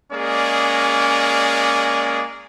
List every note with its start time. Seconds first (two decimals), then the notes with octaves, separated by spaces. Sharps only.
0.12 G#3 A#3 C#4 G#4 D5